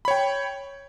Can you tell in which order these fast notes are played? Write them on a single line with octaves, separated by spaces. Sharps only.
B5 C#5 G5